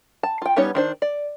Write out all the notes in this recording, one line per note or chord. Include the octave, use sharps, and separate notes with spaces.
A5
F4 G5
G3 B3 C#4 D#4 C#5
D#3 D4 C5
D5